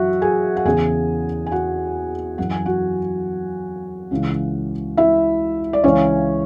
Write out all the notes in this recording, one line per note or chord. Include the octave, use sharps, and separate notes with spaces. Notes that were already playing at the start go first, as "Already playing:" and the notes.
Already playing: F#2 E3 F#4 E5 F#5
G#4 G#5
F#5
E2 C#3 E3 G#4 G#5
G#5
F#4 F#5
F#2 E3 F#5
G#5
F#4 F#5
C#2 C#3 E3
E4 E5
D5
C#2 C#3 E3 C#4 C#5